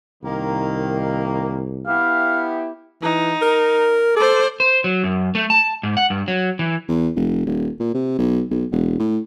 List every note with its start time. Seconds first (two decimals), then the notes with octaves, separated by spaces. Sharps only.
0.23 C2 D#3 A#3
1.87 B3 E4 G4 F5
3.02 E3 D#4
3.41 A#4
4.16 A4 C5 D5
4.60 C5
4.84 F#3
5.04 F#2
5.35 A3
5.50 A5
5.83 G#2
5.97 F#5
6.10 G2
6.28 F#3
6.59 E3
6.88 E2
7.15 F1
7.46 D#1
7.80 A#2
7.94 C3
8.18 B1
8.50 B1
8.71 E1
8.99 A2